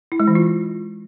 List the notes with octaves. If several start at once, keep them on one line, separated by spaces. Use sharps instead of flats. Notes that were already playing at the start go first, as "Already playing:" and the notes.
E4
G#3
E3
F4